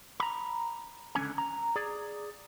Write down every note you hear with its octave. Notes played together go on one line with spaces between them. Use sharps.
A#5 B5
C#2 D3 F3 C#4 G#5
A#5
G#4 D5